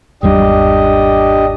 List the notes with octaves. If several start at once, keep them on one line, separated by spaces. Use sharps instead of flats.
G#1 E2 G3 D4 G4 D#5